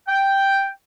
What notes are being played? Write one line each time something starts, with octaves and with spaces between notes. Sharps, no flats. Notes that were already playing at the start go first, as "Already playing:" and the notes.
G5